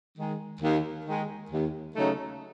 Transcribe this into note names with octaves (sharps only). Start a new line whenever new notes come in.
D#3 G#3
D#2
D#3 G#3
D#2
C#3 F#3 A3 D#4